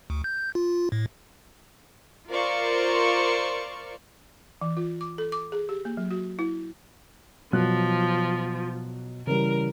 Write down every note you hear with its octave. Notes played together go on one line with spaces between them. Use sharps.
D2
G6
F4
A2
F4 A#4 C5 D5 F5 C#6
E3
F4
D6
A4
D6
G#4
G4
A#3
F#3
F#4
E4
B2 F3 F#3 F#6
C#3 E3 G3 A#4